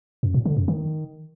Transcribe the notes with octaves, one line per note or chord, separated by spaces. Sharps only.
F#2
A#2
D3
F#2
D#3